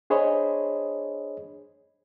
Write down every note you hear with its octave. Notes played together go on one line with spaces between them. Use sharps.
D4 G#4 C5 C#5 D#5 B5